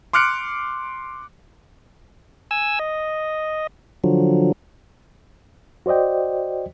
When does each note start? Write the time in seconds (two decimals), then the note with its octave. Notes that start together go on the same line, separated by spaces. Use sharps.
0.13 C6 D6 F6 F#6 C#7 D7
2.51 G#5 E6
2.79 D#5
4.04 D3 F3 F#3
5.86 F#4 C5 D5 D#5 G5